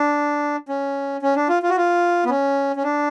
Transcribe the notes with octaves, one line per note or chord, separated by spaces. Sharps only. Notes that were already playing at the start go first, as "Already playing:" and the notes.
Already playing: D4
C#4
C#4
D4
F4
F4
F#4
F4
B3
C#4
C#4
D4